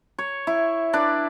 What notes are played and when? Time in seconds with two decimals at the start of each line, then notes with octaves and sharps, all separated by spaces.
0.18 C#5
0.47 E4
0.93 D4 B4 D5